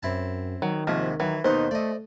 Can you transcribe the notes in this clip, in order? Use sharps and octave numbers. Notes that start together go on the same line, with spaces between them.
F#2 C4 E4 A5
D#3 F#3
D#2 G#2 C3 F3
D#3 E3 F#3
D#2 B2 D#4 C5 F#5
A3 D5 D#5